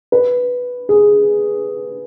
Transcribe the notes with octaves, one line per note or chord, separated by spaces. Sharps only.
B4
G#4